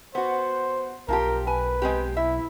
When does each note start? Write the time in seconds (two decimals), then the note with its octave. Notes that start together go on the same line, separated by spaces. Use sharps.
0.15 B3 F#4 C5
1.08 B1 F3 F4 G4 A#4
1.47 B4 G#5
1.82 G#3 C4 G4
2.17 E4 E5